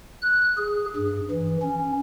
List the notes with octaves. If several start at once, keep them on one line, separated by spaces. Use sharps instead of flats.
F#6
G#4
G2
E3
C#4